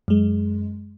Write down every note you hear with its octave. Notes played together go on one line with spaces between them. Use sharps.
F#2 G#3